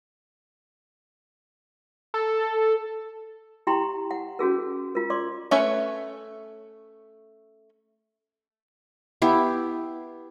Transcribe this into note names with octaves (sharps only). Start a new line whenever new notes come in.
A4
E4 G4 G5 A#5 C6
F#5
C#4 F#4 G#4 A#4
F4 A#4
D5 C6 D6
A3 C#4 B4 C#5 E5
B3 E4 G4